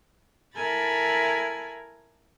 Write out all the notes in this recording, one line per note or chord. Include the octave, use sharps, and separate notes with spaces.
E4 A4 A#4 G#5 B5 A6